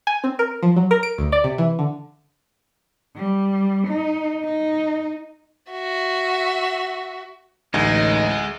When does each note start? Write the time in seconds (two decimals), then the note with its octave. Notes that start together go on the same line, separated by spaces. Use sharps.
0.07 G#5
0.24 C4
0.39 A#4
0.63 F3
0.76 F#3
0.91 A#4
1.03 D7
1.18 D2
1.32 D5
1.44 C3
1.58 E3
1.79 D3
3.16 G3
3.87 D#4
4.44 D#4
5.71 F#4 E5
7.74 A1 D2 G#3 D#4